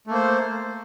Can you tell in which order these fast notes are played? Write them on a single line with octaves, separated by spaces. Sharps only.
A3 A#3 C5